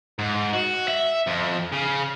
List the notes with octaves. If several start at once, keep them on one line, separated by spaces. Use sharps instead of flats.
G#2
F#4
E5
F2
C#3